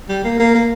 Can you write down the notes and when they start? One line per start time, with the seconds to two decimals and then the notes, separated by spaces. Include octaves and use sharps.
0.09 G3
0.24 A#3
0.39 A#3
0.55 A#3